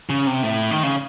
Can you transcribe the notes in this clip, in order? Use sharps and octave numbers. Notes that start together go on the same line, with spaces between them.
C#3
C3
A2
D#3
C#3